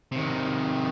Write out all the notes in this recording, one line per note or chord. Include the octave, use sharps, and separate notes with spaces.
C3 D#3